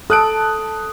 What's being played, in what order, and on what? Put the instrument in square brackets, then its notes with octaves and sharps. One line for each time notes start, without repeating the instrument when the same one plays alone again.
[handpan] A4 [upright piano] D#6 F#6 D7